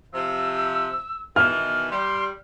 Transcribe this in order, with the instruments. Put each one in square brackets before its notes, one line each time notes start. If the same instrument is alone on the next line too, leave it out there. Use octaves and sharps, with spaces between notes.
[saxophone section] C3 F3 [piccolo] E6
[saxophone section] B2 D#3 E3 [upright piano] F6
[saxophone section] G3 [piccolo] C6